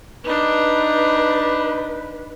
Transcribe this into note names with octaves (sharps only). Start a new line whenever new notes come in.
D4 D#4 B4